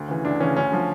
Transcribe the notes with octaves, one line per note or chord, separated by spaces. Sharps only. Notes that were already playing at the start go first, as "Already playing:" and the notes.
Already playing: D2
C#3 E3
D2 D4
C#3 E3 C#4
D2 C#4
D3 F3